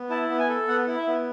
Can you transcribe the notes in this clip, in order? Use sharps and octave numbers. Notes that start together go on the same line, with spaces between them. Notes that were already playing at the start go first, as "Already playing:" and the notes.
Already playing: B3
E4 A5
B3
G#5
A4
B3 F#5
E4
E5
B3